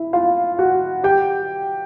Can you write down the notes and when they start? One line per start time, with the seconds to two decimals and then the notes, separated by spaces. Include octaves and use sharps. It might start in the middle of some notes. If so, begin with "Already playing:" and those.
Already playing: E4
0.13 F4 F5
0.59 F#4 F#5
1.04 G4 G5